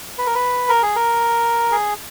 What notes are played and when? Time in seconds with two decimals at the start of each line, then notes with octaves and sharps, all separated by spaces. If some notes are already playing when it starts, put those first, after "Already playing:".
0.18 B4
0.26 A#4
0.35 B4
0.69 A#4
0.83 G#4
0.96 A#4
1.72 G#4